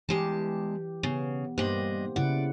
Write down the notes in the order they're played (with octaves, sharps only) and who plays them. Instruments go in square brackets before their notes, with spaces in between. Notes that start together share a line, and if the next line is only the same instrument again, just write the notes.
[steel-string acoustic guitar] E2 G#3 A5 [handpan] E3 G4
[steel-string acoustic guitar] C#3 [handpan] B3
[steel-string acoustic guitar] G2 D4 D#5 [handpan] A#3 G4 C5
[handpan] C#3 E4 F#5 [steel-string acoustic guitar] D5